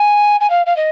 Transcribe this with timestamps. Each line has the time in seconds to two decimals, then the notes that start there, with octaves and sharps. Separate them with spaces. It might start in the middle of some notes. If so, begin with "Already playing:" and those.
Already playing: G#5
0.40 G#5
0.50 F5
0.66 F5
0.76 D#5